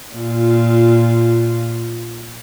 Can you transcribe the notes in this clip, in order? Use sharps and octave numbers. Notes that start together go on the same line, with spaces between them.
A#2 F4